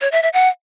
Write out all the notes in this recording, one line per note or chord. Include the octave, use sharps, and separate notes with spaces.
C#5
E5
E5
F#5